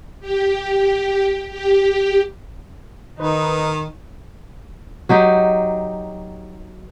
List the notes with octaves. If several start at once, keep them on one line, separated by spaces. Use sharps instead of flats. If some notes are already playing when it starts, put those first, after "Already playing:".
G4
G4
D#3 D#4 B4
F#3 D#4 G4